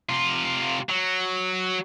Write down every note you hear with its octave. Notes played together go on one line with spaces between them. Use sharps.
C3 F4
F#3